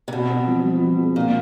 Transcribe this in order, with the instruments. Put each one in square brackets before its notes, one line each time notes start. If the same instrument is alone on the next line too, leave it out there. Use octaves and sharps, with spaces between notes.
[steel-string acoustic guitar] C3
[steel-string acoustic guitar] B2 [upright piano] C4
[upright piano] C4
F3
F3
C4
G#3
[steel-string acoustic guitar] A#2 [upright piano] D4